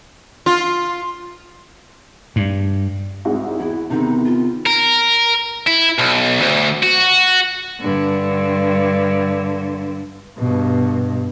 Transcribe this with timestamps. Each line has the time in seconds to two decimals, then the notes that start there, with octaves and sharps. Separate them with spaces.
0.46 F4
2.36 G2
3.25 C2 G#2 F#4
3.60 E2 E4
3.90 C3 D#3 B3 C4 D#4
4.26 F4
4.66 A#4
5.67 E4
5.98 B1
6.41 D2
6.83 F#4
7.81 G2 D3
10.38 G2 B2